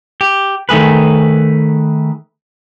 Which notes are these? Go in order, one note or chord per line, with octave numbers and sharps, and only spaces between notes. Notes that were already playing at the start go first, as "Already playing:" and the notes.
G4
D#3 A3 G#4 B4